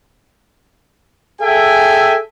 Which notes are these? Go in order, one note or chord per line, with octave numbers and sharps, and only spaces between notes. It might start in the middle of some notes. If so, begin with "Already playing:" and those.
G#4 A4 E5 G5 G#5